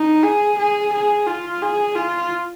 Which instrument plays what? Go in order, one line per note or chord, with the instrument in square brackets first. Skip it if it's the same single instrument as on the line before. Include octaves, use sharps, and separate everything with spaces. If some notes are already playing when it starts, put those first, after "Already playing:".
Already playing: [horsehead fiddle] D#4
G#4
G#4
G#4
F4
G#4
F4